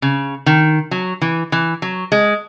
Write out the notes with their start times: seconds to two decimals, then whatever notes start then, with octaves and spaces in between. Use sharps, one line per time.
0.02 C#3
0.46 D#3
0.91 F#3
1.22 E3
1.52 E3
1.82 F#3
2.12 G#3